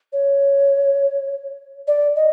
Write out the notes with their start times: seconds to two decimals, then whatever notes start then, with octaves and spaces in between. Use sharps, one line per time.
0.13 C#5
1.87 D5
2.16 D#5